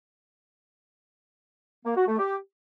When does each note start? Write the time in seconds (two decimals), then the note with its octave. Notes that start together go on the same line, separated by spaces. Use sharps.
1.85 A#3
1.96 F#4
2.08 A3
2.19 G4